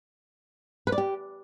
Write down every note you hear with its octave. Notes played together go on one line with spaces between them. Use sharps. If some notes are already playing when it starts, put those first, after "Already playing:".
B4
D5
G4